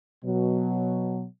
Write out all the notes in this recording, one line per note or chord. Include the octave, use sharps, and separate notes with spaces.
B2 F#3